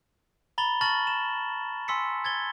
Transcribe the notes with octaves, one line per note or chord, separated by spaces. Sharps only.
A#5 B5 A6 G7
A5 C#6 F6 A6 A#6 F#7
E7
G#5 C6 E6 B6 C#7
G#6 A6 G7